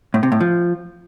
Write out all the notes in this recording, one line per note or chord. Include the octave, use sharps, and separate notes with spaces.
A2
C3
A2
F3